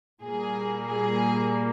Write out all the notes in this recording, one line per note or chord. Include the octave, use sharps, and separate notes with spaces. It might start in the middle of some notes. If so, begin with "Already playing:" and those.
A#2 G3 A#3 G#4
G#4